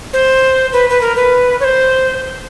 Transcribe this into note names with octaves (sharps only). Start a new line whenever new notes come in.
C5
B4
B4
A#4
B4
C#5
C5